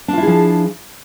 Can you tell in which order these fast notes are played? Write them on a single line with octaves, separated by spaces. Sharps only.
D4 F4 E4 G#4 F3